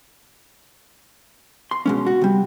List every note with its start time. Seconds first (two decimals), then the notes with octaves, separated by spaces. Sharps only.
1.71 C6
1.86 B2 G#3 C#4
2.07 F#4
2.22 C3 G3